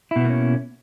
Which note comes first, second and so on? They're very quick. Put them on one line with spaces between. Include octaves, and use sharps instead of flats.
E4 B2 B3 A#3 C#4